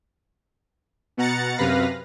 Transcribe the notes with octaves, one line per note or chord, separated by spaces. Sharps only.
B2 F#5 A#5 A6 C#7
F#2 C3 B4 F5 A#6